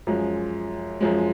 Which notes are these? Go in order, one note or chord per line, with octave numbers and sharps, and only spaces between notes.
F#2 F3 G#3
F#2 F3 G#3